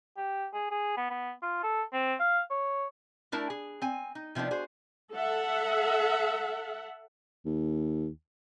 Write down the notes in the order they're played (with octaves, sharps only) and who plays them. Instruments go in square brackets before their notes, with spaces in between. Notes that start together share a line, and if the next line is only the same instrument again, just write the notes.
[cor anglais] G4
G#4
G#4
B3
B3
F4
A4
C4
F5
C#5
[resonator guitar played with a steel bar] A3 D4 E4 A#4 A5
G#4
C4 G#5
D#4
C3 F3 B3 D4 D#4
F#4 G#4 C5
[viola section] A4 E5 F#5
[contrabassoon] D#2